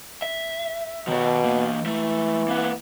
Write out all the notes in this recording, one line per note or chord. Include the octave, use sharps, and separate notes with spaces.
E5
B2 D#3 C#5
E3 A#3
E3 A3 A#3
A#3 B3